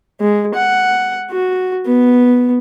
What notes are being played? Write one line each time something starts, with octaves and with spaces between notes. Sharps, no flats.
G#3
F#5
F#4
B3